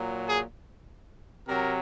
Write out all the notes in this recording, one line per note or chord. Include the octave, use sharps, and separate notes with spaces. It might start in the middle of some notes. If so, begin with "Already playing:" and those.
Already playing: A#2 F#3
G#4
C3 F#3 A#4